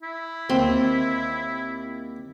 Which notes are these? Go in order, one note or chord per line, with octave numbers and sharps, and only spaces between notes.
E4
D#2 C4